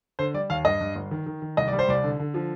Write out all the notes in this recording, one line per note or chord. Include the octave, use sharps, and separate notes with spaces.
D3 C5
G3 D5
D#2 F5
G2 D#5
G2
G1
D#3
D#3
D#3
C2 D#5
G3 D5
C5
C2 D5
D3
D3
F3